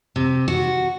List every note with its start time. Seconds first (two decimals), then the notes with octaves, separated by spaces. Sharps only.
0.16 C3
0.48 F#4